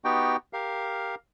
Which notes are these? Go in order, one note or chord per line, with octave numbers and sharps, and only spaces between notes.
B3 D#4 F#4 G4 G5
G4 A#4 F5